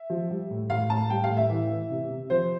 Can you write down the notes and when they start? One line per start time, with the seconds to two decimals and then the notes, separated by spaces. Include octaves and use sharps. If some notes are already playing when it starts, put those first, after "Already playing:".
Already playing: E5
0.10 F3
0.30 G3
0.50 A2
0.70 A2 F5
0.90 A2 A5
1.10 G3 G5
1.24 F5
1.30 A2
1.37 E5
1.50 E3
1.70 E3
1.90 C3
2.10 C3
2.30 F3 C5